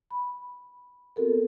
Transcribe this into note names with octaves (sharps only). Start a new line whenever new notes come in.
B5
B3 C4 F#4 A4 A#4